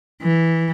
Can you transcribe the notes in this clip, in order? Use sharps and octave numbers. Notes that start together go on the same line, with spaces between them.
E3